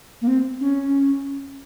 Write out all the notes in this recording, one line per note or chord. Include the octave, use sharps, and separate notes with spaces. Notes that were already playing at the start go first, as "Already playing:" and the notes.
A#3
C4
C#4